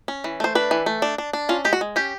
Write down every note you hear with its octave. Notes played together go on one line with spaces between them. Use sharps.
C#4
E3
A3 C5
D4 B4
E3
A3
D4
D4
D4
C#4 F4
G#3 G4
F#4
G#3
C#4 G4